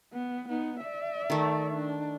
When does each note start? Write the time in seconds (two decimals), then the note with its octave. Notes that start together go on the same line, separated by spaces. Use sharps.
0.13 B3
0.49 B3 D#4
0.80 D5 E5
1.30 D#3 A3
1.74 D4